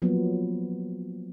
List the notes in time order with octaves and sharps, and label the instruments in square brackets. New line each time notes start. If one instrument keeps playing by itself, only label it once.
[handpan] F3 F#3 A#3 B3